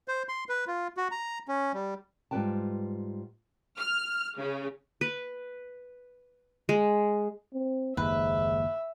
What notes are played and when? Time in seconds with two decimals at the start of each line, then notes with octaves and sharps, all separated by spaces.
0.08 C5
0.29 C6
0.49 B4
0.67 F4
0.97 F#4
1.11 A#5
1.48 C#4
1.74 G3
2.31 G#2 G3 F4 B4 G5 A5
3.77 F6
4.37 C#3
5.01 B4
6.69 G#3
7.53 C4
7.97 F#1 D#2 G#2 B4 E5